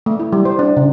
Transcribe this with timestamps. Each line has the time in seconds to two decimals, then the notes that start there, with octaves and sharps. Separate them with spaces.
0.06 A3
0.20 E4
0.33 G3
0.45 C5
0.59 D4
0.77 C#3